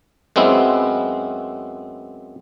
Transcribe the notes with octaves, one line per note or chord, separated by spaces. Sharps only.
F#2 G#3 B3 C4 E4